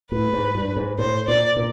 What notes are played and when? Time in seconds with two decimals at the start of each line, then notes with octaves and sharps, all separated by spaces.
0.11 A2 B4
0.33 G#2
0.55 G2
0.76 G#2
0.98 A2 C5
1.28 A#2 D5
1.57 A#2